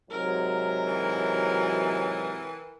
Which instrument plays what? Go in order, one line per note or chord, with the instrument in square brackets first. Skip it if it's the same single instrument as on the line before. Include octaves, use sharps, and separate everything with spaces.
[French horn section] G#2 C3 F#3 [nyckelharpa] A#4
[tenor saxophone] E3